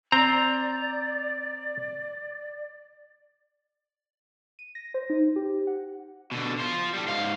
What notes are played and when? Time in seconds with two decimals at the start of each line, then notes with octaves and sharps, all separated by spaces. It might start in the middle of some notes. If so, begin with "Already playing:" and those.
0.12 C4 D5 A#5
4.59 D#7
4.75 A#6
4.94 C5
5.10 D#4
5.36 G4
5.67 F#5
6.32 B2 D3
6.59 F4 C5
6.93 A2 G3
7.08 G#2 F5